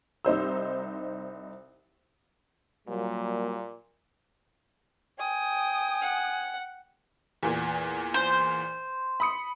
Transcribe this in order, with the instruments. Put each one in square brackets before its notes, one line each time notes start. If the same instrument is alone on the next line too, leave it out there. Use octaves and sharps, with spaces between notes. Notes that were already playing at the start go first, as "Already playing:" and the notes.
[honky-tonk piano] C2 D#4 C5 E6
[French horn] A#2 [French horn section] F#3 G3 A#3
[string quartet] G5 [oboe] G#5 [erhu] D#6
[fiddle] F#5
[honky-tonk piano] E2 A#2
[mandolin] C5
[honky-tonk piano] B5 D#6 C#7